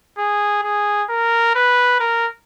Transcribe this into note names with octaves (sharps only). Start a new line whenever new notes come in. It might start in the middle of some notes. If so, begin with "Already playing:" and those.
G#4
G#4
A#4
B4
A#4